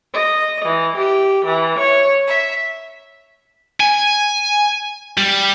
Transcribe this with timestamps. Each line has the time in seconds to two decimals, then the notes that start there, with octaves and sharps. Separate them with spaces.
0.13 D#5
0.65 E3
0.97 G4
1.45 E3
1.78 C#5
2.26 E5
3.80 G#5
5.17 G3